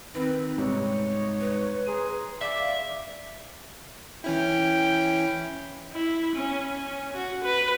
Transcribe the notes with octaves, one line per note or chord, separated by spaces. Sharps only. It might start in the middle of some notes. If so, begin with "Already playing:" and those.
D#3 C4 B4
G#2 C3 G3 D#4 C#5
B4
G#4 A#5 C6 D#7
D5 E5 F5
E3 C#4 E4 G5
E4
C#4
C#4
F#4
B4